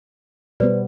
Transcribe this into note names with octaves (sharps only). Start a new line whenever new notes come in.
B2 G3 B3 B4 C5 D5